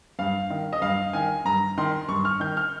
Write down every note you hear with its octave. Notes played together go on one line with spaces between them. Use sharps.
G2 F5
D#3
D#5
G2 F5
D#3 G#5
G2 A#5
D#3 C6
G2 C#6
F6
D#3 G6
F6